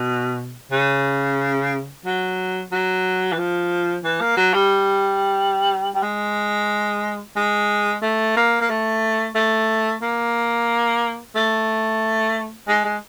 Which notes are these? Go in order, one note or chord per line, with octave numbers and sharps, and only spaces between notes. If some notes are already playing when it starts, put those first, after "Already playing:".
Already playing: B2
C#3
F#3
F#3
E3
F3
E3
A#3
F#3
G3
G3
G#3
G#3
A3
A#3
A#3
A3
A3
A#3
A3
G#3
G#3